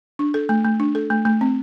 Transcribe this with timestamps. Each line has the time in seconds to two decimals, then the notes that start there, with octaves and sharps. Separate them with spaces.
0.19 D4
0.34 A4
0.49 A3
0.65 A3
0.80 D4
0.95 A4
1.10 A3
1.25 A3
1.41 C4